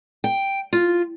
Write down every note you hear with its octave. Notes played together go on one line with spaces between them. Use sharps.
G5
F4